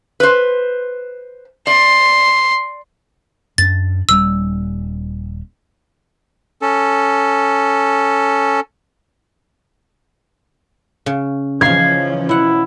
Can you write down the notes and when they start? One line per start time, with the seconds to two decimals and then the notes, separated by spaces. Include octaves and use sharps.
0.20 B4 C5
1.67 D5 C6
3.58 F#2 D4 A6
4.09 D#1 G3 C#4 E6
6.62 C#4 A4
11.06 C#3
11.61 C#3 E3 F3 C#4 D#4 F4 G#6 C7
12.29 B2 E4 F#5